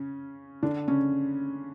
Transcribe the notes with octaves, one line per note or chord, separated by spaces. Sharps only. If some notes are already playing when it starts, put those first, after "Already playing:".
Already playing: C#3 C#4
D3 D4
C#3 C#4